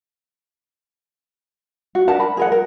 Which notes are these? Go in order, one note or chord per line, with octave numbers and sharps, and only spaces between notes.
F#4
D4 A#4 F#5 A5
B5
G#4 A#4 F#5
A#4